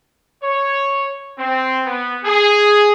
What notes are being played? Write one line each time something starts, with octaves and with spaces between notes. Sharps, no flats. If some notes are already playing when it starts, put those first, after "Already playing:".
C#5
C4
B3
G#4